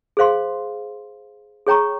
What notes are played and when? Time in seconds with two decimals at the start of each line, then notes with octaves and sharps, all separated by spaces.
0.17 G#4 C5 F5 C6
1.67 G#4 C#5 G5 A#5 C#6